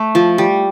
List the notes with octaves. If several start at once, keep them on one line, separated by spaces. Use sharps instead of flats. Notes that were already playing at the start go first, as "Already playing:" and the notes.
Already playing: A3
F3
G3